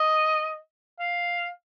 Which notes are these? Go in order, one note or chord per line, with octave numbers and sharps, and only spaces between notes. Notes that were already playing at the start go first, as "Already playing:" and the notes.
Already playing: D#5
F5